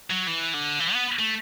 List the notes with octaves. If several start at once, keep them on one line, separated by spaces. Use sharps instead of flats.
F#3
E3
D3
E3
B3
A3